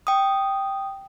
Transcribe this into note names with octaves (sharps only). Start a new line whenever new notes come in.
G5 D#6